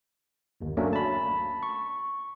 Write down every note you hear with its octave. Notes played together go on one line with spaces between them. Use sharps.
G1 D#2
F#3 A3 A#3 C#4 D4
A5 B5
C#6